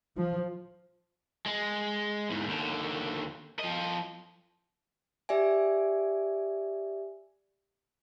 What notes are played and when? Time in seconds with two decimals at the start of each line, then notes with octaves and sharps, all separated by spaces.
0.16 F3
1.46 G#3
2.30 E2 G#2
2.47 D#2 D3
3.59 F3 D#5
5.29 G4 D5 E5 G#5